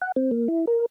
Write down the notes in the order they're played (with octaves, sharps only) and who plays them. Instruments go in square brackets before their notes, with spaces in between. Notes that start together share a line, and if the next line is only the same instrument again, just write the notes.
[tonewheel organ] F#5
C4
A#3
E4
A#4